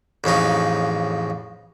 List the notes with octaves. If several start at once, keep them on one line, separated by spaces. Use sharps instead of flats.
A1 F2 C#3 D#4